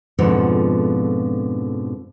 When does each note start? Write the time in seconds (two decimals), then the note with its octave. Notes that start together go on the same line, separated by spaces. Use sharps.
0.19 F2 G#2 B2 D3 F3